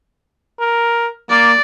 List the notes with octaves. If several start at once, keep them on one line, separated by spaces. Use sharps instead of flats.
A#4
A#3 D5